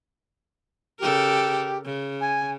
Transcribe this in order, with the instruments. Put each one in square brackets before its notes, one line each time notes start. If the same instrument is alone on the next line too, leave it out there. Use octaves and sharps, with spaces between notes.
[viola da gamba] C#3 A4 A#4 [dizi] G4
[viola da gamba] C#3
[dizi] G#5